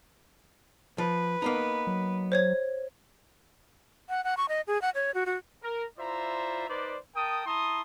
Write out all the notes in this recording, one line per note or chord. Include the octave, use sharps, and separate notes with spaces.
F3 B4
A#3 B3 D#4
F#3
C5 C#5 G#6
F#5
F#5
C#6
D#5
G#4
F#5
C#5
F#4
F#4
A#4
E4 F4 C5 D5 E5 A#5
D#4 B4 C5 D5
A#4 G5 A5 D#6
E4 A5 A#5 C6 D#6